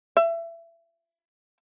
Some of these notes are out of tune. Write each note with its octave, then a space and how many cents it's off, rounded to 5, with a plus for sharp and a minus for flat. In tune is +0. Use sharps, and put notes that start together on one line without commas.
E5 +25